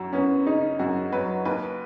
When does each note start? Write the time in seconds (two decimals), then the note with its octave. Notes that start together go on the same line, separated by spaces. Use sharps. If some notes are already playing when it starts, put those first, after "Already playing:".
Already playing: F#2 F#3
0.13 B3 C#4
0.46 C#3 D#4
0.79 F#2 F#4
1.12 F#3 B4
1.45 D#2 B4